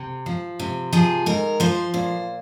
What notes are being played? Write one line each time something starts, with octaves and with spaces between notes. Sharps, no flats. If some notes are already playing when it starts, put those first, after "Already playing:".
Already playing: C3
F3
C3
F3 G#4
G#2 A#4
F3 C5
A#2 C5